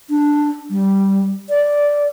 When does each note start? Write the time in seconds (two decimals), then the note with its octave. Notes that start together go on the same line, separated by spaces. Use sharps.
0.10 D4
0.70 G3
1.50 D5